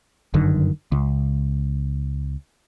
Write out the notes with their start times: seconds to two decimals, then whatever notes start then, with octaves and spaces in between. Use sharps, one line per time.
0.34 G1 F#2 D3 D#3
0.92 C#2